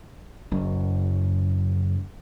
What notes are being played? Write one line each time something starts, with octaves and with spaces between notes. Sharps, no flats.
F#1 F#2